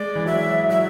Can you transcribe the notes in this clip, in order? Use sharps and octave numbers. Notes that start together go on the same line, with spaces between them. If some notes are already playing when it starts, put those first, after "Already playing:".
Already playing: G#3 D5
E3
F#3 E5
F#3 E5